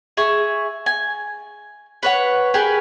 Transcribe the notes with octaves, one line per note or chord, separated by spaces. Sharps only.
G#4 E5 C#6
G#5
B4 C#5 F#5
G4 G#4 A#4 B4